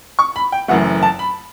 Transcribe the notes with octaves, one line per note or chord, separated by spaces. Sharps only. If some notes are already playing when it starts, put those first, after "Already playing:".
C#6
B5
G5
F#1 F#2 E3 A3 F#5
A5
B5